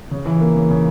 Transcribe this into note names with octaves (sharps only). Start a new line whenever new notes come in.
C#3
E3
A#3
C#3
C#3